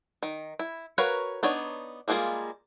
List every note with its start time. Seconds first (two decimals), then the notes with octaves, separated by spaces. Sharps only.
0.23 D#3
0.59 E4
0.98 F#4 A#4 B4 C#5 F5
1.43 B3 D4 D#4 C#5
2.08 G3 G#3 A#3 F4 G#4